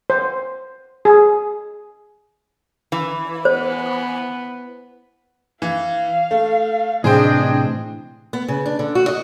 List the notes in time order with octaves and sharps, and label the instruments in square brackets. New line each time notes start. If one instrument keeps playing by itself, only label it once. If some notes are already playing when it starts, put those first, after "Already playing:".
[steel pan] C5
G#4
[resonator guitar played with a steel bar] E3
[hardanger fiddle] B3 [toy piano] C5
[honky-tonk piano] E3 [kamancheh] F5
[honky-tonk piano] A3
[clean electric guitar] A2 C3 E3 [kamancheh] D4 D#5 [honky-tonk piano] G#4 C5 G5
[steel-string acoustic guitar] B3
C#3
D4
D3
F#4
D#5